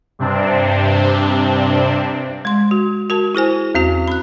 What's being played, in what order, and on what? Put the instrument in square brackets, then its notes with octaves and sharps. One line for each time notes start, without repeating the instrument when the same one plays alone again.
[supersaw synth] G2 C3 C4 D4
[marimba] G#3 C6
F#4
F#4 A#4 A5
E4 G#4 C5 G#5
E2 C4 F#4
B5 F#6